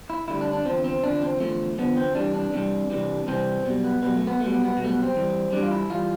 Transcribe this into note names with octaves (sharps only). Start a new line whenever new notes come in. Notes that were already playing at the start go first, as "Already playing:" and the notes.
E4
D2 D3 G3 E4
D4
D4
E2 D3 F3 C4
C4
E2 D3 F3 D4
C4
E2 D3 F3 A3
E2 D3 F3 B3
C4
C2 C3 E3 G3 D4
D4
C2 C3 E3 G3
C2 C3 E3 G3
C2 C3 E3 G3 C4
B1 B2 G3
B3
B1 B2 G3 B3
A3
B3
B1 B2 G3 A3
B3
B3
B1 B2 G3
A3
B3
C4
G2 E3 G3
G2 E3 G3 D4
F4
E4
G2 E3 G3 F4